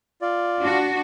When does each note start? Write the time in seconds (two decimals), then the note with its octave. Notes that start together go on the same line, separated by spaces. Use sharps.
0.22 F4 D5
0.62 D4 F#4